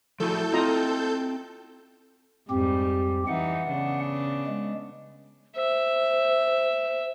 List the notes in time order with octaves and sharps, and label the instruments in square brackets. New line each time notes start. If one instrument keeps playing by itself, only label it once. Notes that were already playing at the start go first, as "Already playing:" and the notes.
[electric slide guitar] F3 G#4 [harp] A3 E4 F#4 [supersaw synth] A4 G6
[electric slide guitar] C4 [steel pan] F4 D#5 A#5
[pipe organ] F2 C4 G4 [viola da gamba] G#2 G3
[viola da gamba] E3 D#4 [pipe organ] F#5
[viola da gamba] C#3 B3 D4
[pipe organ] G#3
[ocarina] C5 [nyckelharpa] E5